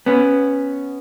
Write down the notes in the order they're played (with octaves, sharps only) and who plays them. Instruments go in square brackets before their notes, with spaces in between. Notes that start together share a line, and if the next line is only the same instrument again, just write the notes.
[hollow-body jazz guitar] B3 C#4